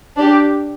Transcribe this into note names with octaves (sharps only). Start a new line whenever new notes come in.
D4 G4